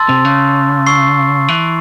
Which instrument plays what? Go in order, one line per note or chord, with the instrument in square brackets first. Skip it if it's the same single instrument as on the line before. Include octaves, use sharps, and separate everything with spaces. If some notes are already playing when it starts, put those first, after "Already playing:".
Already playing: [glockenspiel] A5 C6 E6 A6
[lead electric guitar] C3
C#3
[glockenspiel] C#6 E6 C7
[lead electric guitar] E3